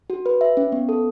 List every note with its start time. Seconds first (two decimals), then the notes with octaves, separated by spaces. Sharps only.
0.10 F#4
0.26 B4
0.41 E5
0.57 C#4
0.72 B3
0.89 A4